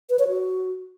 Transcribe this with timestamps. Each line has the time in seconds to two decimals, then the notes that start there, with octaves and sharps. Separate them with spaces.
0.10 B4
0.19 C#5
0.28 F#4